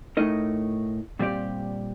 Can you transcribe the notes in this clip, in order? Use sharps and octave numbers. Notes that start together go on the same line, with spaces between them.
A2 A3 D#4 A#4 D#5
A#2 G3 C4 G4 D5